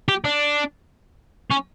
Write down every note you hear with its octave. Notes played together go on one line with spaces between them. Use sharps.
G4
D4
C#4